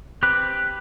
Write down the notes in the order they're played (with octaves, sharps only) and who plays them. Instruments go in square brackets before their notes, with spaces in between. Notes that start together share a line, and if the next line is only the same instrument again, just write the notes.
[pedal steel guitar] C4 G4 B4